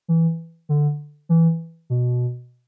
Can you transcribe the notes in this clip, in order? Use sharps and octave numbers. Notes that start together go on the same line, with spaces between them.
E3
D3
E3
B2